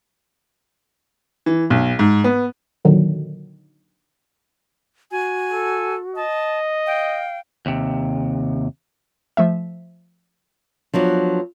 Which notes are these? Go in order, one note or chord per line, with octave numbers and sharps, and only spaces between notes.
E3
B1
G#2
B3
A#2 D3 D#3 F#3
F#4 G#5
A4
D#5 A5
F5 G5
D#2 C3
F3 A3 E5
F3 F#3 B3 D4